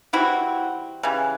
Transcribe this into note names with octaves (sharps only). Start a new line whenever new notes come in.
E3 G3 C4 E4 F#4
C#3 E3 G3